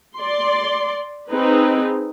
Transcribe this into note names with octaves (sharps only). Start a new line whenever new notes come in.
D5 C6
C4 D#4 G#4 B4